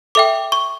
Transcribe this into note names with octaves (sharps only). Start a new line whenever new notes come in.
A4 E5 G5 D6
C#6